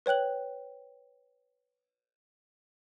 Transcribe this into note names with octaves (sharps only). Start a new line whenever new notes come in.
B4 C#5 G5 F#6 F#7